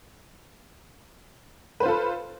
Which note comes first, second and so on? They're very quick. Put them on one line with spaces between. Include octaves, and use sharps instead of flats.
B4 C5 F4 A4